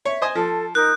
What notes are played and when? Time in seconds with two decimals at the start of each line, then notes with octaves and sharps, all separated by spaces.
0.05 C#5 E5
0.22 C5 D#5 G#5
0.35 F3 A4 A5
0.75 D#4 A#4 D#6 F#6 G6